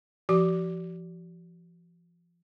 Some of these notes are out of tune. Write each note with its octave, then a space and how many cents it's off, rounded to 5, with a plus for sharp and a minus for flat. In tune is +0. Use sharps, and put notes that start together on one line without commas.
F3 -30 G4 -45 D6 +0